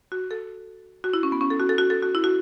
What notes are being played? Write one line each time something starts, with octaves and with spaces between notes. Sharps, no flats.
F#4
A4
F#4
E4
C#4
B3
C#4
A4
F#4
A4
F#4
A4
F#4
E4
F#4